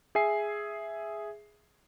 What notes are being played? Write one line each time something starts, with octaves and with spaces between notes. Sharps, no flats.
G#4 E5 G#5 C7